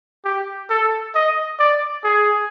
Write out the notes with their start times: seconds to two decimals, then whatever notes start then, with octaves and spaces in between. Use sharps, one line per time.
0.25 G4
0.70 A4
1.15 D#5
1.59 D5
2.04 G#4